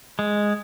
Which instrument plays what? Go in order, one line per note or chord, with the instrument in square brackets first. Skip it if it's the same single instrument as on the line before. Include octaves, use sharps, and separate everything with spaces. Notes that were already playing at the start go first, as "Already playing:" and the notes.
[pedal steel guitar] G#3